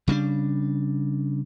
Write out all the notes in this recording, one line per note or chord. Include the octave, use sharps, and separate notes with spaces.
C#3 G3 A#3 D4